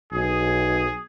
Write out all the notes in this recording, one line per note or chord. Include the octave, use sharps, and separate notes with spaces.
B1 G#4